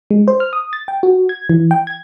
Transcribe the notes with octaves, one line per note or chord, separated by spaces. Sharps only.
G#3
C5
F6
D#6
A6
G5
F#4
G#6
E3
G5
G#6